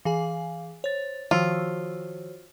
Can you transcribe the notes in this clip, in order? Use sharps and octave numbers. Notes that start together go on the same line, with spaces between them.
E3 G#4 F5 G#5
C5 C#5 A6
D#3 F3 F4 F#4 C5 C#5 E6